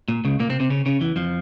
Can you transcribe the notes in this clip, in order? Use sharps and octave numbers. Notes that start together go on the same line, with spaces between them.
A#2
C#2 C#3
A#2 A#3
C3 C4
C3 C4
C#3 C#4
C#3 C#4
E2 E3
F2 F3